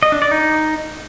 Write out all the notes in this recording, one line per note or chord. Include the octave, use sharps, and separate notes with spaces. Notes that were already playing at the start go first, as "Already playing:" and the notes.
D#5
D4
D5
D#4